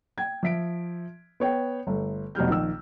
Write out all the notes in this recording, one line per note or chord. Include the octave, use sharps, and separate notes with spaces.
G5 G#6
F3 E5 B6 D7
B3 C#5 G5
G1 A3
F1 B2 G3 F6 G6
A#1 D#3 E6